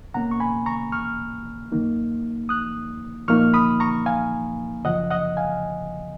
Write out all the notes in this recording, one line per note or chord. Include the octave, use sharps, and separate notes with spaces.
B2 A#3 C#4 F#5 A#5
C#6
G#5 B5
A#5 C#6
C#6 F6
F#2 D#3 A#3 D#4
D#6 F#6
A#2 F3 A#3 D#4 C#6 F6
B5 D#6
A#5 C#6
F5 G#5
F#2 C#3 F3 D#5 F#5
D#5 F#5
F5 G#5